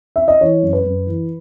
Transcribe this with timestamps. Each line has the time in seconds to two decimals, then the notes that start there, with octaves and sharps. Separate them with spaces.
0.16 E5
0.28 D#5
0.41 E3 C#5
0.63 F#2
0.73 B4
0.85 F#2
1.07 E3